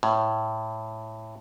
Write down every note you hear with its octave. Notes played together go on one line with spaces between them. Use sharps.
A2